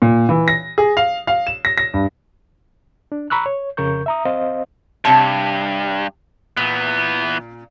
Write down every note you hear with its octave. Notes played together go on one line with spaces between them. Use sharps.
A#2
E3
A#6
G#4
F5
F5
E7
A#6
A#6
G2
D4
A#5 B5 C#6 E6 F#6
C#5
F2 C#3 A#4 C#6 G6
E5 A#5 D#6
C4 C5 D#5 F5
G2 C3 C#5 A5
A#2 E3 B3